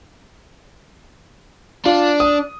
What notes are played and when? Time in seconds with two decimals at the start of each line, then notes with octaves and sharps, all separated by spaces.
1.86 D4 F4
2.20 D#6